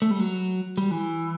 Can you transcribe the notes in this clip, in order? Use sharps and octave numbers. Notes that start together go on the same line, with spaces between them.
A3
G3
F#3
G3
E3